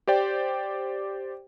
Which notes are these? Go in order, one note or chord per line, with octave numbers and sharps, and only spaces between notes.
G4 C5 D5 G5